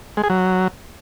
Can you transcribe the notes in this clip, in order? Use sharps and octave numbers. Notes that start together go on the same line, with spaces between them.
G#3
G#4
F#3